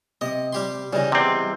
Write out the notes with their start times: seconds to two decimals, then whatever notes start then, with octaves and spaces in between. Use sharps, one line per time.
0.21 C3 D#5
0.53 G3 G4 C6
0.93 C#3 E3 G3 D#5
1.12 E2 C3 C4